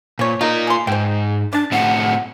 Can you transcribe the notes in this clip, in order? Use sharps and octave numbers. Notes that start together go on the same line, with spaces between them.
A#2 F3 C#5
D#4 F4 A#4
G#4 C6
G#2 C5 G5
D4 D5 A5
A2 C4 F#5